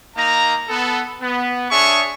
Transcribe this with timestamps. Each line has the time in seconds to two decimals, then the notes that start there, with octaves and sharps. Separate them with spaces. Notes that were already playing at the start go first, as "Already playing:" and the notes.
0.17 A#3 D#4 A#5
0.69 B3 A4
1.21 B3
1.70 D4 G#4 C#5 E5 C#6